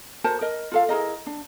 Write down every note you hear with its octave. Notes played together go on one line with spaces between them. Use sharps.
F#4 A#4 C5 A5
A#4 D#5
F4 A4 F5
E4 G#4 A#4 D#5
D4